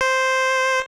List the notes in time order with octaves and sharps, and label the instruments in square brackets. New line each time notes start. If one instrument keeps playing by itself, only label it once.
[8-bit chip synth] C5